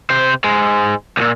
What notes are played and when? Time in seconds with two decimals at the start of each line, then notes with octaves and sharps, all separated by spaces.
0.10 C3 C5
0.44 G#2 G#3
1.17 C2 A#2